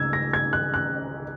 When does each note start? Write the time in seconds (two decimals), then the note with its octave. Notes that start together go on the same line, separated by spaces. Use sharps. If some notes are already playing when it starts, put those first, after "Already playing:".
Already playing: C#2 C#3 E6 G#6
0.13 A#6
0.33 G#6
0.53 F#6
0.74 F#6